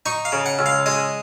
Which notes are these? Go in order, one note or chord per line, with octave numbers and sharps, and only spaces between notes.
D#4 C#6
F5
C#3
F#5
C#2
F5
G#3 D#5